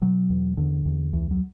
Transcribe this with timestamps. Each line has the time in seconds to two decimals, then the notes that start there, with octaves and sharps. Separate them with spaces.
0.01 B2 F#3
0.30 E2
0.57 E2 D3
0.85 E2
1.13 C#2 E3
1.31 F#3